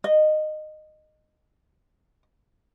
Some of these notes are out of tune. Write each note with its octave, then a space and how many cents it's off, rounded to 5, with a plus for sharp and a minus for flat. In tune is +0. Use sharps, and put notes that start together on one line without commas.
D#5 -15